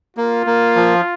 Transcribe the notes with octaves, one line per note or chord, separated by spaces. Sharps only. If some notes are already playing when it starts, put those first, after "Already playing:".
A#3 F4
A#3
F3